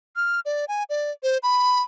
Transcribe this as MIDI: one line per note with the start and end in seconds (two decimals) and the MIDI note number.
0.16 0.40 89
0.45 0.65 74
0.68 0.84 80
0.90 1.11 74
1.23 1.38 72
1.43 1.81 83